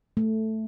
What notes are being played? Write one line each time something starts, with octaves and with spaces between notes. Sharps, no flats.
A3